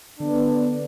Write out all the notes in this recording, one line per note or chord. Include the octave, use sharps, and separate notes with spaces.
D3 B3 D4